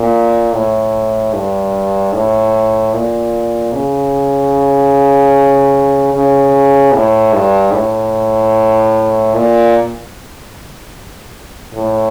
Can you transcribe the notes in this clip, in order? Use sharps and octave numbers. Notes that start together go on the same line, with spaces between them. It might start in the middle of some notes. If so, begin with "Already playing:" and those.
Already playing: A#2
A2
G2
A2
A#2
C#3
C#3
A2
G2
A2
A#2
A2